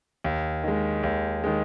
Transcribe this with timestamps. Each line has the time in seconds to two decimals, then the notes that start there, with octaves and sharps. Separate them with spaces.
0.24 D#2
0.64 D#3 G#3
1.03 D#2
1.44 D#3 G#3